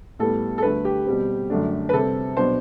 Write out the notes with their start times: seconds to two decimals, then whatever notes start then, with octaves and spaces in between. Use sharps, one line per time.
0.19 A2 G3 B3 A4
0.58 A4
0.62 D2 D3 A3 B4
0.85 G4
1.06 B2 G3 C4
1.50 F#2 D3 A3 D4
1.89 B4
1.93 C3 G3 C4 A4
2.37 B2 F#3 B3 D4 C5